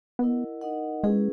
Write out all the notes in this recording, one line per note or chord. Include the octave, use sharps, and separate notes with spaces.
B3 E4 A#4 D#5 F#5
D#4 A#4 D#5 F#5
G#3 C#4 E4 G#4 B4